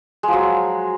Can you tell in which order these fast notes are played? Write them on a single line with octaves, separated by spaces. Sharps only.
G#3 F3 F#3